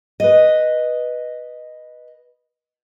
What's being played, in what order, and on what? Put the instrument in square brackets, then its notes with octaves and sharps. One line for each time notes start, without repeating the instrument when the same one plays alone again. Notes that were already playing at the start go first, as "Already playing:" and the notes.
[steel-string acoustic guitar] B4 D#5